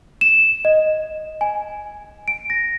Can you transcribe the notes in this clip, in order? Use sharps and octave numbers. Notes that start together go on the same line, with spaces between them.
E7
D#5
G#5
D7
A#6